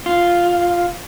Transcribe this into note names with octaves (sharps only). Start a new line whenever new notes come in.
F4